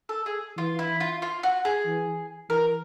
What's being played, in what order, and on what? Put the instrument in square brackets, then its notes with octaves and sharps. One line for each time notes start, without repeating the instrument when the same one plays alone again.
[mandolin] A4
G#4
[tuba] E3 [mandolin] F4
[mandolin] E4
F4
F4
F#4
G#4
[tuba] E3
[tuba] E3 [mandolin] A#4